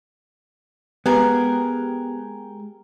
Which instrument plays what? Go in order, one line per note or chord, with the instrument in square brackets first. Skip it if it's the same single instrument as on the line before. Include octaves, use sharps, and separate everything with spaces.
[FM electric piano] G#3 G4 G5 [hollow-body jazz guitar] B3 [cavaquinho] G#4 A#4